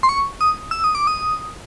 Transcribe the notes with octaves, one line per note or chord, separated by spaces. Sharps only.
C6
C#6
D#6
E6
D#6
D6
D#6